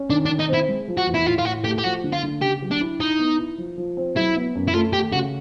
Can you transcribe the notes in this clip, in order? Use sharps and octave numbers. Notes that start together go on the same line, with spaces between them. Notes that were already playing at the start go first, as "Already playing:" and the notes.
Already playing: C#4
D#3 D4
D4
D#3
D#4
C4
E4
G#3
F3
F#4
E2
E4
A2 F4
F4
A2 F#4
A3 G4
G4
F3 F#4
D3
F4
D3
C#3 G4
F#3
D4
E4
D#4 E4
B3
E4
F3
F3
C4
F#3 E4
B3
F#2
E4
A3 F4
A3 G4
C#3 F#4